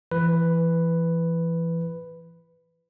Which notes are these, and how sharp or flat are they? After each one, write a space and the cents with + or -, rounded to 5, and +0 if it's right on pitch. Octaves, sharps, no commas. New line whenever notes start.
E3 +25 B4 +5